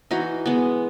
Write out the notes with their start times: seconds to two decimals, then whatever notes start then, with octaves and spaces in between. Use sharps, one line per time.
0.11 E3 D#4 F#4
0.46 G#3 B3